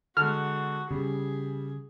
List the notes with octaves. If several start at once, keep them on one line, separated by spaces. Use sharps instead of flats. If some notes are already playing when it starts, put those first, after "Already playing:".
D3 G#3 F#4 F6
C#3 G3 C#4 G#4